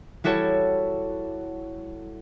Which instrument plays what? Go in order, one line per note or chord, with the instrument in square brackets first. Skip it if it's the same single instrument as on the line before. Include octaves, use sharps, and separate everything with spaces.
[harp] G3 E4 F#4 A4 C#5